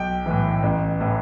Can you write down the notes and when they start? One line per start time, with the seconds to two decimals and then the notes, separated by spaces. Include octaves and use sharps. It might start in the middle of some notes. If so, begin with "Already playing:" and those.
Already playing: B1 G5
0.26 A2 E3
0.63 A1
1.00 A2 E3